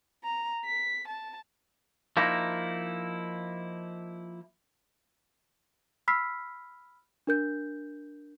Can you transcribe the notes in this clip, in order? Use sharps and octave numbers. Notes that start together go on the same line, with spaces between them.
A#5
B6
A5
F3 A#3 D#4 E4
B5 E6 F6 B6 C7
D4 A#4 G6